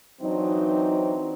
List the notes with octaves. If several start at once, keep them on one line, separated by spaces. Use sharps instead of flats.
E3 F#3 C4 D4 D#4